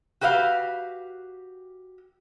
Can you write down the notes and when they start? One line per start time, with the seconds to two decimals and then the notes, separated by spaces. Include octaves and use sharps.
0.21 F#4 G4 B4 D#5 F5